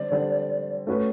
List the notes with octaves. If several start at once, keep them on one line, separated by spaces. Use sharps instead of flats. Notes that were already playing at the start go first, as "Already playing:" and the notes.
Already playing: D3 G3 C4 D5
D3 G3 C4
A3 C#4 F#4 B4